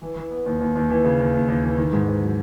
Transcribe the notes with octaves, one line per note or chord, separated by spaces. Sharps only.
E3
E3
B3
D#2
D#2
D#2
E3
C#3
D#2
D#2
D#2
E3
D#3
G#2
G#2
F#3